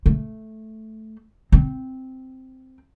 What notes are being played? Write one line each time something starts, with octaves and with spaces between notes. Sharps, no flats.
A3
C4